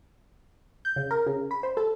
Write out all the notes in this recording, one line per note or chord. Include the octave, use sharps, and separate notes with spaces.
G6
C#3
A#4
C#3
B5
C5
A4